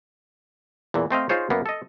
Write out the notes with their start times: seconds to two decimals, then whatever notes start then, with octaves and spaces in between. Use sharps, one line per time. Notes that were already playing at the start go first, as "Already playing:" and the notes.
0.94 E2 A#2 E3
1.11 A3 C4 D#5 F5
1.29 D#4 F4 G#4 C5 C#5
1.50 F#2 A#3 B3
1.66 A4 D#5